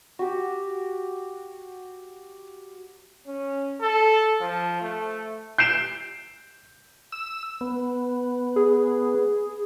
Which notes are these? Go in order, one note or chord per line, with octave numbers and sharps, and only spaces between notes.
F#4 G4
C#4
A4
F3
A3
G6 C7 D7 E7
E6
B3
G#4